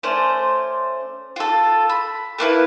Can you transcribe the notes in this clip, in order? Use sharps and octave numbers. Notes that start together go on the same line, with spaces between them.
A3 C#4 C5 D5
F4 A4
B5
A3 A#3 E4 B4